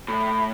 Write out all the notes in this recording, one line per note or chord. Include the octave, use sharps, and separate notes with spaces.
A2